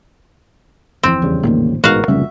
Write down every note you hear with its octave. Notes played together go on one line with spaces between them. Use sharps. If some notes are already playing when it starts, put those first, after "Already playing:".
G1 F2 E3 C4
E2 C#3 G3
A#1 A2 D#3 A#3
A1 G#2 B2 F#4 A#4 F5
F1 C#2 A#2 C#3 G3 C#4 E5